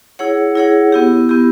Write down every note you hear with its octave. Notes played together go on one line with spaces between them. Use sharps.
E4 G#4 C#5 F#5
E4 G#4 C#5 F#5
B3 E4 G4
B3 E4 G4